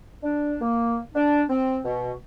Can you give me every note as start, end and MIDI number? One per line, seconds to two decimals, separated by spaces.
0.23 0.55 62
0.61 0.99 58
1.15 1.43 62
1.49 1.78 60
1.85 2.12 47